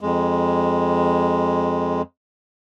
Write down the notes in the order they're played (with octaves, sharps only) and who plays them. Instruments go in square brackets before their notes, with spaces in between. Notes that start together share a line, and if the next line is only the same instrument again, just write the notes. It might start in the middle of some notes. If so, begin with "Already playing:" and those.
[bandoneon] F2 G#3